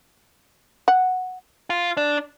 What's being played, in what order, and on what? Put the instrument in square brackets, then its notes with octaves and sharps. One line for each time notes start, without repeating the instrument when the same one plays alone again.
[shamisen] F#5
[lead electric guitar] F4
D4